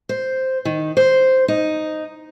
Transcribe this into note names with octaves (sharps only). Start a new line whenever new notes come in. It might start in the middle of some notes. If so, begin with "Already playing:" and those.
C5
D#3
C5
D#4